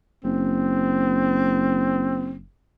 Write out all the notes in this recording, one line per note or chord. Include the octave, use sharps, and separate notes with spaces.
F#1 C4